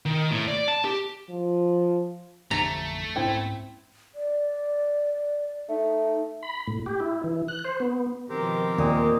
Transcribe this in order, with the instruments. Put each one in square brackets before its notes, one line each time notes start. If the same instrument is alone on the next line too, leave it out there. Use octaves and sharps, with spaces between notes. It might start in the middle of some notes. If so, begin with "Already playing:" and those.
[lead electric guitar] D#3
A2
D5
A5
G4
[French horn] F3
[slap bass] A1 F2 D3 [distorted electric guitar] A3 [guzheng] A#5
[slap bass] G#2 C#4 [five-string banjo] C4 E4 G5
[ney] D5
[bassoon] A3 [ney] D#4
[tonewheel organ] B5
A2
G4
E4
E3
F#6
C5
B3
[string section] B2 D#3 F3 [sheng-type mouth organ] C4 G4 A#4
[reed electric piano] D#2 [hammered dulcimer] A#2 D#4 D#5